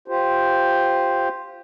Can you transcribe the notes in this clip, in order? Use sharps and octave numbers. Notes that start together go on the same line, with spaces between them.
F4 G4 C5